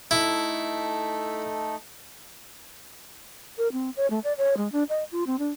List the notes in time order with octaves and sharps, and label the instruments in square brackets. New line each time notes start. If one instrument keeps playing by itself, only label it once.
[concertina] A3 D#4 A4 [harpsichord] E4
[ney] A#4
C4
C#5
A3
D5
C#5
G#3
D4
D#5
F4
C4
D4